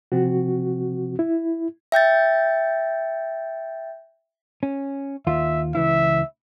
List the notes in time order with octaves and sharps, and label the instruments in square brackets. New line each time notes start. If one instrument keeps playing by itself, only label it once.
[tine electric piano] C3 F3 C4 [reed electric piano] F#4
[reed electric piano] E4
[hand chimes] E5 G5 G6 A6
[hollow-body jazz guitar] C#4
[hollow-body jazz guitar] D#2 F4 [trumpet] E5
[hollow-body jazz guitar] C#2 E3 E4 [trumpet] E5